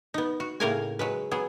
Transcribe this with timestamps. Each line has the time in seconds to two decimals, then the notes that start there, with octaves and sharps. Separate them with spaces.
0.14 B3 D#4
0.40 F#4
0.60 A2 C#3 A#3 A#4 F5 G#5
0.99 F#3 G#3 B4
1.31 F#3 B3 G#4